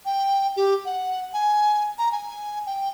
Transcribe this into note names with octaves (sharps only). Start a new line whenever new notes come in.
G5
G4
F#5
G#5
A#5
G#5
G5